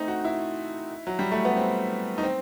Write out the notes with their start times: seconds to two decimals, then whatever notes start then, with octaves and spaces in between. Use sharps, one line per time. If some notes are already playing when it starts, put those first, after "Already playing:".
Already playing: A3 C4 D#4
0.08 F#4
0.24 E4
1.07 F#3
1.19 G3
1.32 A3
1.45 B3
1.57 C4
2.18 D#4
2.23 C4